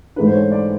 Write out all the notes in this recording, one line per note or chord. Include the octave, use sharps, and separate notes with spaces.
G#2 E3 A3 D4 B4
C5
C#5
D5